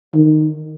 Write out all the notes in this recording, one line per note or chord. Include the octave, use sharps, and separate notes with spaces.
D#3